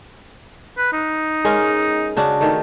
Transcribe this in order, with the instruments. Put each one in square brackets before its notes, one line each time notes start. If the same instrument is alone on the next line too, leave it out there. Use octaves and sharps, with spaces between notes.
[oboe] B4
D#4
[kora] G#3 C#4 A#4
C#3 D4 F#4
D#3 A3